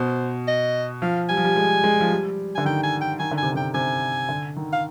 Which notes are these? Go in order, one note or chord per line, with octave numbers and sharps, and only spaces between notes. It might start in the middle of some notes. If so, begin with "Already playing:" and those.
Already playing: B2 C5
D#5
F3 F5
G3 G#5
F3
G3
G#3
G#3
F3
G3
D3 G#5
D#3 G5
G#5
G5
D#3 G#5
D3
G#5
C3
D3 G5
C3 G#5
D3
D#3
F5